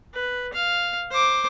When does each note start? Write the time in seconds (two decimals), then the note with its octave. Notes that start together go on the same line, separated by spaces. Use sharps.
0.14 B4
0.53 F5
1.11 C5 D6